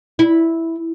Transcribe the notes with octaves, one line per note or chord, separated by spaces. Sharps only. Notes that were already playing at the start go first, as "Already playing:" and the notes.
E4